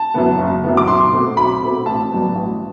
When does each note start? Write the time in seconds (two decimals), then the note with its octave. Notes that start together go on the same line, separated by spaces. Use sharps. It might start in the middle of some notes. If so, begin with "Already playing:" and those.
Already playing: A5
0.14 F#2 E3 B3
0.39 F#1
0.64 F#2 E3 B3
0.77 D6
0.88 B1 C6
1.12 B2 A3 C4
1.37 B1 B5
1.61 B2 A3 C4
1.86 A1 A5
2.11 G2 F#3 B3
2.35 A1